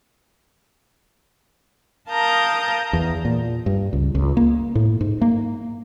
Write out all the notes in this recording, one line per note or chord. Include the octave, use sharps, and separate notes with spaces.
A#4 F5 A5 A#5 D#6 G6
E2
A#2
G2
C#2
C#2
A#3
A2
G#2
A#3